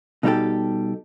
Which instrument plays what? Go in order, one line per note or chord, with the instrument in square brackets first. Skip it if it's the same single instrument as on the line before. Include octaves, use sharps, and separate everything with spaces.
[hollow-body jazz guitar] B2 G3 D#4 E4 G4 A4